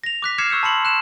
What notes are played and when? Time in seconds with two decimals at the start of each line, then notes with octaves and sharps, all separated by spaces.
0.04 A#6 F7
0.22 D6 F#6 B6
0.38 D6 F6 G#6 C7 C#7 E7
0.50 C#6 E6 G6 C#7
0.63 A5 B5 C6 C#7 F#7
0.85 F#6 E7